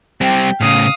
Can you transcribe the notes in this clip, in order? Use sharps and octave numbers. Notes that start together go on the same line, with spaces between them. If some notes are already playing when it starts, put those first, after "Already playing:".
G3 C4 G5
A2 C#3 F5 D#6